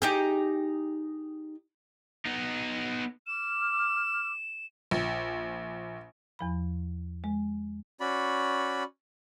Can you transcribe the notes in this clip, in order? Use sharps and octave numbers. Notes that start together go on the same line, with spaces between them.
D#4 G4 G#4
B3 D#4
D6 F6 E7
A#1
E2 F3 B5
G#3
C#4 F#4 D5 B5